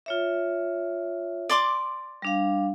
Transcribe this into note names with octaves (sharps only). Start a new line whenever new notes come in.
F4 C#5 E5
D5 C6 D6
G3 D4 F5